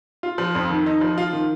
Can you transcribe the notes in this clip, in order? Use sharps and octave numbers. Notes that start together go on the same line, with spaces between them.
F4
F3
F2
D#3
D#4
F3
F4
D#3